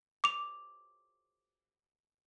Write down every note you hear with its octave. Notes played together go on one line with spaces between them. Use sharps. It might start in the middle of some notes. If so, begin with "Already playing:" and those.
D6 F7